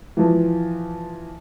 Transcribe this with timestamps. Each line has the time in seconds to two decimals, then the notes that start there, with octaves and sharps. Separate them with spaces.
0.17 E3 F3